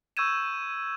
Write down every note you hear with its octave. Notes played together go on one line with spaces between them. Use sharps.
C#6 E6 G6 G#6 D#7 E7